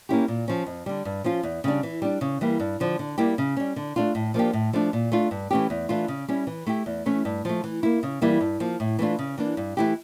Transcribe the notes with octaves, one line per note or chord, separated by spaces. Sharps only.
A#3 C#4 E4 G4
A#2
F3 C#4
F2
D3 G3
G2
F3 C#4 F4
E2
C#3 G3 D4
E3
G3 D4
C#3
E3 G3 A#3
G2
D3 F3
D3
G3 A#3 E4 G4
C#3
G3 C#4
D3
A3 D4 F4
A2
F3 A#3 D4 G4
A2
F3 A3 D4
A#2
A3 D4 F4
G2
E3 A3 C#4 G4
E2
E3 A3 D4 F4
C#3
G3 C#4 E4
E3
A3 E4 G4
E2
E3 A3 C#4
G2
F3 A3
E3
A#3 E4
C#3
E3 G3 A#3 E4
G2
F3 A#3
A2
E3 A3 D4 F4
C#3
E3 A#3 D4
G2
E3 A3 E4 G4